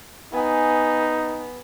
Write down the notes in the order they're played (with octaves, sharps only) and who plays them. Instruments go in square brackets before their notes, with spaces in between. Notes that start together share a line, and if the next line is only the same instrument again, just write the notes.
[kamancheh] B3 [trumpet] D#4 [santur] G#5